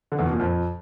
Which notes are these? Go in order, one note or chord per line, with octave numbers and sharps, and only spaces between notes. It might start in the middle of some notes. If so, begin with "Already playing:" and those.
D3
E2
B2
A#2
F2